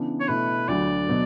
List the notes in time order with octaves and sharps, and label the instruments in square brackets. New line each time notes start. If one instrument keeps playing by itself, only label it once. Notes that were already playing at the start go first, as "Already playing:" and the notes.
Already playing: [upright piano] C#3 E3 B3 D4
[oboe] C#5
[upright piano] B2 A3 E4 [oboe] B4
[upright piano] D2 D3 F#3 [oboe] D5
[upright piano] B2 F#3 B3